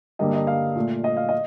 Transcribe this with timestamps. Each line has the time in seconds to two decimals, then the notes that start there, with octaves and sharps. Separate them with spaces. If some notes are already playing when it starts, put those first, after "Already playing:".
0.19 G2 D3 G3 A#3 D#5
0.34 D#5
0.47 F5
0.76 A#2 A3
1.04 D#5
1.17 F5
1.29 D#5